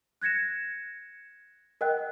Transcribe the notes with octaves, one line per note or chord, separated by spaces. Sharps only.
F#6 G#6 A#6 C#7 E7
A#4 D#5 F#5 G5 F#6